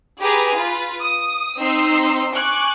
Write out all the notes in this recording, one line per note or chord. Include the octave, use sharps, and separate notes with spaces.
G4 G#4 B4 A#5
F4 B4
D#6
C4 D#4 C6 E6
G#5 C#6 D6 F#6